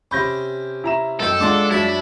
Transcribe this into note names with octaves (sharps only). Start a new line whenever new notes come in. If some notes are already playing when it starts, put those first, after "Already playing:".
C3 C#4 B5 G6 A#6
E4 A#5 E7
F#2 D#4 A4 G5
G#3 D4 F4 D5 F#5 C6 D6
F#2 E4 A5 B5